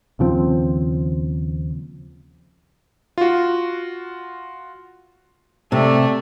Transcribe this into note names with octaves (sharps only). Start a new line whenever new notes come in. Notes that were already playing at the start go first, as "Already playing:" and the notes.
D#2 C#3 F3 C4
F4 F#4
C3 A3 D5